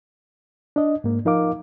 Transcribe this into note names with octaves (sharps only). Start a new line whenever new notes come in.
D4 D#5
G#2 A#3
F3 D#4 A#4 F5 D6